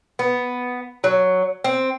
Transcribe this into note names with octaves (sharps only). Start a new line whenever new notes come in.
B3
F#3
C4